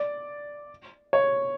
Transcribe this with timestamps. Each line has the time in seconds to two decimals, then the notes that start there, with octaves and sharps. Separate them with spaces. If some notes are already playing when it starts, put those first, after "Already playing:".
Already playing: D5
1.13 C#5